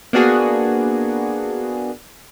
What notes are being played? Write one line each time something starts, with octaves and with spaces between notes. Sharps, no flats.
A#3 B3 D4 F#4 G#4